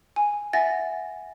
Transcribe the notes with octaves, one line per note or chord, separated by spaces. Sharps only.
G#5
E5 F#5 G#5 A6 A#6